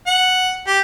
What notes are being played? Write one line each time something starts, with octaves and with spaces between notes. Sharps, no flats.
F#5
G4